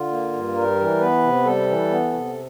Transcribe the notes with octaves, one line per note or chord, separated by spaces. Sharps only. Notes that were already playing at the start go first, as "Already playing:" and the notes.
Already playing: D3 F4
A#3
G2
G3 A#4
E3
B3 B4
C3
G3 A4
E3
B3
C3